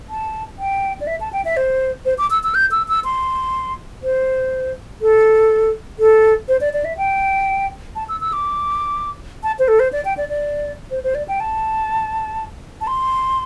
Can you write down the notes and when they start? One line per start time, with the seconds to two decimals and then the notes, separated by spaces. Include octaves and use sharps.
0.09 A5
0.59 G5
1.01 D5
1.07 E5
1.21 A5
1.33 G5
1.45 E5
1.57 C5
2.05 C5
2.18 D6
2.30 E6
2.43 E6
2.55 G6
2.71 E6
2.88 E6
3.04 C6
4.03 C5
5.01 A4
5.99 A4
6.48 C5
6.61 D5
6.73 D5
6.85 E5
6.97 G5
7.96 A5
8.09 E6
8.21 E6
8.33 D6
9.43 A5
9.59 C5
9.68 A4
9.80 C5
9.92 D5
10.05 G5
10.17 D5
10.29 D5
10.91 C5
11.04 C5
11.15 D5
11.28 G5
11.40 A5
12.81 A5
12.87 C6